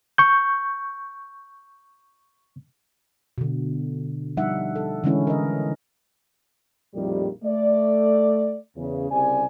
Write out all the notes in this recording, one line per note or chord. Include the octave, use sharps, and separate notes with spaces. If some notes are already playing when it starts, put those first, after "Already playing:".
C#6 G6
B2 D3
F3 G3 D4 D#4 E5 F#5
A4
D3 E3 G#3 C#4 E4
A#4 D#5
A#1 F2 A2 D#3 G3
A3 D5
E2 C#3
C2 C#3 G3 C4 D5 G#5